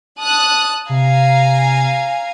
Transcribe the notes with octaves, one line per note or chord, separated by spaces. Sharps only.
A5 D#6 F#6
C3 F5 G#5 A#5